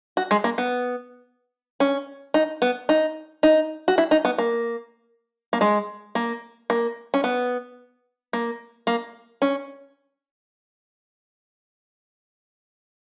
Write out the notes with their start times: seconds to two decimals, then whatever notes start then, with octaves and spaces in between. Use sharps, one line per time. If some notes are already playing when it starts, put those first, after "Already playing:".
0.17 F#4
0.31 G#3
0.44 A#3
0.58 B3
1.80 C#4
2.34 D#4
2.62 B3
2.89 D#4
3.43 D#4
3.88 F#4
3.98 E4
4.11 D#4
4.25 B3
4.38 A#3
5.53 A#3
5.61 G#3
6.15 A#3
6.70 A#3
7.14 C#4
7.24 B3
8.33 A#3
8.87 A#3
9.42 C#4